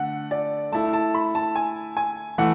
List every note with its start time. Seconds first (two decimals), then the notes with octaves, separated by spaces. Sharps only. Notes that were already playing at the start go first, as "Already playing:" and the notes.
Already playing: D3 A3 F#5
0.31 D5
0.72 A3 E4 A4 A5
0.93 A5
1.15 B5
1.35 A5
1.56 G#5
1.97 G#5
2.38 E3 A3 E4 F#5